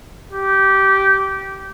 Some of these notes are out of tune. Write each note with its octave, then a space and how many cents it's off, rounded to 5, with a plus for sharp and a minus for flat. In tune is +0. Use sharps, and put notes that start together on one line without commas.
G4 -15